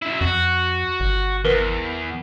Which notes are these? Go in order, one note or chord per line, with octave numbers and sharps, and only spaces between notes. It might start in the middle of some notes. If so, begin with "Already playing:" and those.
F#2 E4
F2 F#4
G1
E2 A#4 B4